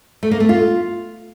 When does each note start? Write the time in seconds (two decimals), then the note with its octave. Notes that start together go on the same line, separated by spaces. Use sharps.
0.23 A3
0.31 A#3
0.40 A3
0.49 F4